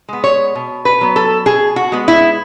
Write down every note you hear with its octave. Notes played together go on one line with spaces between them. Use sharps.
G#3 B3
C#5
B2
B4
F#3 B3
A4
B2 G#4
F#4
G#3 B3
E4